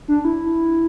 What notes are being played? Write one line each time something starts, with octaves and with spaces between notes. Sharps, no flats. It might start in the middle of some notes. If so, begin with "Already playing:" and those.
D4
E4